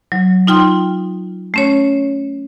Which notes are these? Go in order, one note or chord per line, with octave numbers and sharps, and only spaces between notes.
F#3
D#4 F4 G5 C6
A3 C#4 C#5